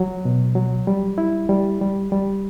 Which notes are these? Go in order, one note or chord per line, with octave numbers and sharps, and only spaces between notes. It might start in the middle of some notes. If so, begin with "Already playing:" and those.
Already playing: F#3
B2
F#3
G3
E4
G3
G3
G3